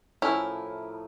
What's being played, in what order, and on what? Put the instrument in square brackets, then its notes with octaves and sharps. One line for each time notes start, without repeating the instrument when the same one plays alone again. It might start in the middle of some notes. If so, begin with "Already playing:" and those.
[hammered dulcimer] A2 F3 A#4 [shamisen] C#4 [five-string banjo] E4